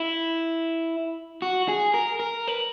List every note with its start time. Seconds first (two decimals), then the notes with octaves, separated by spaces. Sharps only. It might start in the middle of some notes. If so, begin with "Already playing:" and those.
Already playing: E4
1.42 F#4
1.68 G#4
1.94 A#4
2.20 A#4
2.48 B4